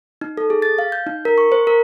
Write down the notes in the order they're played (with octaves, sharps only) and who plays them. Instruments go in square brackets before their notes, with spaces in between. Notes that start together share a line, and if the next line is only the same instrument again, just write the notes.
[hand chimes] D#4
A4
G#4
A6
F5
G6
D#4
A#4
C#6
C5
A#4